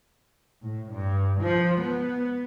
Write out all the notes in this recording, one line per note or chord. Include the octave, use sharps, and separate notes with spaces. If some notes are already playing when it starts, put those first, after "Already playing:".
A2
G2
F3
B3